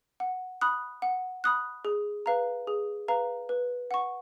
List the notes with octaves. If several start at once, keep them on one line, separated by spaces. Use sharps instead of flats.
F#5
B5 D#6 F#6
F#5
B5 D#6 F#6
G#4
B4 F5 A#5
G#4
B4 F5 A#5
B4
F#5 C#6